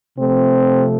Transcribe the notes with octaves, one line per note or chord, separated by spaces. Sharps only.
C3 F3 A3 C4